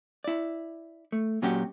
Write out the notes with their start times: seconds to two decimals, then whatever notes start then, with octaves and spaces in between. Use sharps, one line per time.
0.24 E4 D5
1.12 A3
1.42 A#2 F#3 C#4 F#4 G4